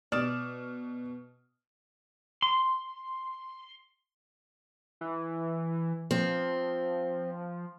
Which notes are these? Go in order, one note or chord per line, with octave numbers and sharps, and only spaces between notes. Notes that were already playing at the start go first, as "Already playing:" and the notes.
B2 D5 D#6 F6 E7
C6
E3
F3 C4